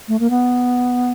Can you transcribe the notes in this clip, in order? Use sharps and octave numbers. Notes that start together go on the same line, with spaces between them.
A3
A#3
B3